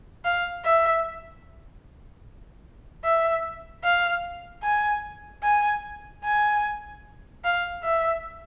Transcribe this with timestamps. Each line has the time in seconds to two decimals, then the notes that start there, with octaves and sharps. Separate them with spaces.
0.25 F5
0.64 E5
3.04 E5
3.83 F5
4.63 G#5
5.43 G#5
6.24 G#5
7.44 F5
7.83 E5